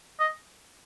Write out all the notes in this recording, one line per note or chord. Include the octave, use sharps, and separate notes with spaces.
D#5